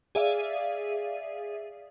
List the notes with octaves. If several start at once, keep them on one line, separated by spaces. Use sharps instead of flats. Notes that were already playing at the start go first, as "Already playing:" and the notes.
G#4 D5 E5 F5 D#7